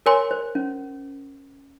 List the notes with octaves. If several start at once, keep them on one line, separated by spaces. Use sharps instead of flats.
A#4 C#5 G#5 C6
C5
C#4